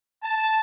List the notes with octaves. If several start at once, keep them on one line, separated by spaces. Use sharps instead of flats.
A5